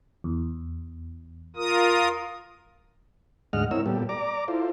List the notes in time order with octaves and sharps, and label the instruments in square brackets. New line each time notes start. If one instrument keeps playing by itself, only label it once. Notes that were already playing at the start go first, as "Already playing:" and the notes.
[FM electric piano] E2
[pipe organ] F4 A#4 D#6
[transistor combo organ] D2 G#2 G#3 D#5 F#5 F6
C4 E4 A#4 C#5 E6
A#2 G3 B3 G4 A4
D5 A#5 D6
E4 F4 A4 C5